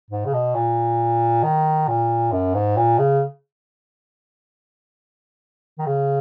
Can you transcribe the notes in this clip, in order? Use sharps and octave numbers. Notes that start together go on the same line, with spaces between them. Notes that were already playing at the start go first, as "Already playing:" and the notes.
G#2
C#3
B2
A#2
D#3
A#2
F#2
G#2
A#2
C#3
D#3
C#3